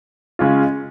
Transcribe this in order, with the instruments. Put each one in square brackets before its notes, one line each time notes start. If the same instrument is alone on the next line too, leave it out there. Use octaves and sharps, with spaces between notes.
[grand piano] C#3 G#3 C#4 F4